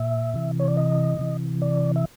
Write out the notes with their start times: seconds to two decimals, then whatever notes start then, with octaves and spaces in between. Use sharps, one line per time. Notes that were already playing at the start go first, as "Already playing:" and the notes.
Already playing: A#2 E5
0.34 C3 E3
0.59 C#5
0.68 D5
0.77 D#5
1.19 C3 E3
1.62 D5
1.96 E5